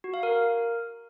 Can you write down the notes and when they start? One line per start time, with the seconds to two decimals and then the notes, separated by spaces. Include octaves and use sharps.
0.04 F#4
0.14 F5
0.23 A#4